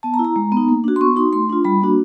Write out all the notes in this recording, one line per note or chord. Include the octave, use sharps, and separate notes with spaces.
B3 A5
A#5
E4
A#5
G#3
B3 D#4
A#3
D4 F#4
C6
B3 C#6
D#4 F#4 C6
A3 C6
D4 F4
G3 B5
A#3 D4 F#4